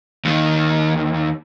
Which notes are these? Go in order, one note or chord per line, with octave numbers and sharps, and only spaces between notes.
D#2 D#3